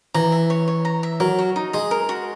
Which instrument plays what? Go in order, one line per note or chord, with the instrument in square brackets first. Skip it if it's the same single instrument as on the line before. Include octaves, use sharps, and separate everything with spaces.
[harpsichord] E3 [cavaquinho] A#5
[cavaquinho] E5
C#5
C#5
A#5
E5
[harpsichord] F#3 [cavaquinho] A#4
[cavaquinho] F#4
D#4
[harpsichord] G#3 [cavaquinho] D#5
[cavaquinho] A#4
F#4